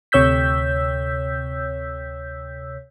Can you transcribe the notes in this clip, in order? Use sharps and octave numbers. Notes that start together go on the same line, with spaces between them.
D2 C3 C#5 E6 G6 B6